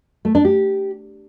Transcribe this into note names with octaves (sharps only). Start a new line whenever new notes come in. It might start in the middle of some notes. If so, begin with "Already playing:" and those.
A3
D4
G4